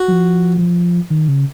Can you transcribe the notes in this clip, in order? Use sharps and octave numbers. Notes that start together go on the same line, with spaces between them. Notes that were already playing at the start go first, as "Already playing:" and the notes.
Already playing: F#4
F#3
F3
D#3
C#3